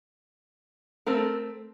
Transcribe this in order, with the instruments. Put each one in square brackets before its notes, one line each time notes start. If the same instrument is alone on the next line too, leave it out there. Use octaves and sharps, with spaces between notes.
[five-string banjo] A3 C4 A4 A#4